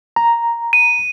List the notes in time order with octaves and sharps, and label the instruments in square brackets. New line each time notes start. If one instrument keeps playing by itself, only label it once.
[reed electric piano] A#5
[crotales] D#7